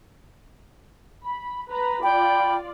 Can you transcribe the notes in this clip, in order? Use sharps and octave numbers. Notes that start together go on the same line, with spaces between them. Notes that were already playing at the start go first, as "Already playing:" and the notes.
B5
B4 A#5 B5
F4 D5 G5 B5